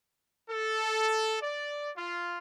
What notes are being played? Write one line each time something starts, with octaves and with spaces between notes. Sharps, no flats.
A4
D5
F4